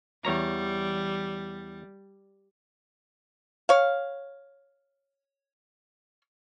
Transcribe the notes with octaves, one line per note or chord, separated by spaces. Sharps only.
E2 G3 C#5 A#5
C#5 F5